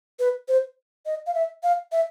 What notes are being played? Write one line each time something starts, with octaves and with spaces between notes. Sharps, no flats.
B4
C5
D#5
F5
E5
F5
E5